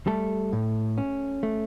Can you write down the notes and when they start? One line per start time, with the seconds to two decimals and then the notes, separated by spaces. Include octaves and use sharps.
0.07 G3 A3 A4
0.53 A2
0.98 C#4
1.43 A3